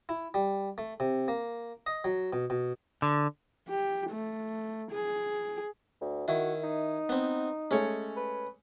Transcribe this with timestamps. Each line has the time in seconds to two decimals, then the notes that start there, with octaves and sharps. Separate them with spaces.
0.09 E4
0.34 G3
0.78 A3
1.00 C3
1.28 A#3
1.86 D#5
2.04 F#3
2.33 B2
2.50 B2
3.02 D3
3.69 G4
4.11 A3
4.91 G#4
6.01 D2
6.28 D#3 E4 F#4
6.64 D#4
7.09 B3 C4
7.71 G#3 A3 C#4 C#5
8.16 B4